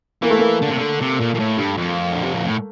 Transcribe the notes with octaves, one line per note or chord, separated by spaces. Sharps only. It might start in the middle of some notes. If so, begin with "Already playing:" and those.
E3 A#3
A3
A#3
D3
C3
D3
C3
A#2
A#2
A2
G2
F2
D3
C3
A#2
A2